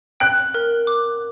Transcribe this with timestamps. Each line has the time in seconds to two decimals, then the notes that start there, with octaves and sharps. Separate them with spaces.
0.20 G5 F#6
0.54 A#4
0.87 D6